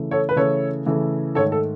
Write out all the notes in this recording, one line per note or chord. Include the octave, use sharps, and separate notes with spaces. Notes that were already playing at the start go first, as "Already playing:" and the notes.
Already playing: C#3 E3 A3
A4 C#5
B4
C#3 E3 A3 A4 C#5
C#3 E3 A3
G#2 D#3 A3 A4 C#5
A4